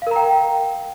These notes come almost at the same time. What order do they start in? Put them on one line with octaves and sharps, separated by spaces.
F5 A#4 A#5 G5